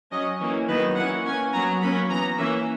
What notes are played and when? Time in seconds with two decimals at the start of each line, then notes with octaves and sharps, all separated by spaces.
0.11 F#3 C#4 D#5
0.40 E3 A#3 C#4 C#5
0.68 D#3 F#3 B3 B4
0.96 E3 A#3 C#4 F#5
1.24 E3 A#3 C#4 G#5
1.53 F#3 B3 A#5
1.81 F#3 A#3 C#4 B5
2.09 E3 B3 A#5
2.37 E3 A#3 C#4 E5